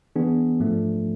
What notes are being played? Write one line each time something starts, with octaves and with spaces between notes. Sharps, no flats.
E3 B3 D4 G#4
G#2 F3 A3 D4